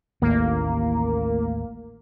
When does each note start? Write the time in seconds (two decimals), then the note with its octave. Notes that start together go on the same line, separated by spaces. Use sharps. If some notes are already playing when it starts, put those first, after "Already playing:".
0.22 A1 D#2 A2 A#3